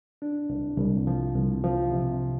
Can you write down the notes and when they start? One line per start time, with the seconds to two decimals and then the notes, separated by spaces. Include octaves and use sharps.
0.22 D4
0.50 C2
0.78 C2
1.07 F3
1.35 C2
1.64 F3
1.92 C3